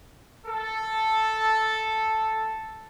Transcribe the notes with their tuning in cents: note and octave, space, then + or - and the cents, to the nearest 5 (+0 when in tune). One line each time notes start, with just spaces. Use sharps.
A4 +0